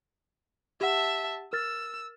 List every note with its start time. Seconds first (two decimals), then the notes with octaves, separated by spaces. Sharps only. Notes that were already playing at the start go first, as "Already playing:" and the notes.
0.81 G4 E5 F#5 A5
1.53 A#4 E6 F6 A6